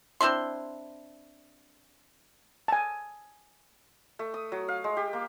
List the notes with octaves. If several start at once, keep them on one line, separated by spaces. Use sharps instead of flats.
C4 D4 E4 C6
G#5 A5
A3
D#6
F#3
F5
G#3
G4
A#3